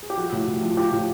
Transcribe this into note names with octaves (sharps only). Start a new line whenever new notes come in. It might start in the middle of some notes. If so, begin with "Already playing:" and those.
G#4
G4
F3 F#4
A2
A2
F3
F3 G4
A2